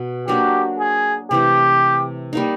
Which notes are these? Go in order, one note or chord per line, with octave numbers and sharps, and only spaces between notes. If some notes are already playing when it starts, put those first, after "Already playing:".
Already playing: B2
F#3 A#3 D4 F#4 G4
G#4
C3 E3 A3 G4
G3 A#3 D#4